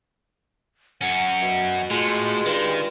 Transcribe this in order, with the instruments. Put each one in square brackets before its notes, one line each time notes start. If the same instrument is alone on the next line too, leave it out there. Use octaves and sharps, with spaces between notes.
[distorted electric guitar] F#2 C#4 [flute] F#5
[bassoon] B2
[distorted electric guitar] A2 [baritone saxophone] G#3 [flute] F4
[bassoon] G2 [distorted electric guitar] D#3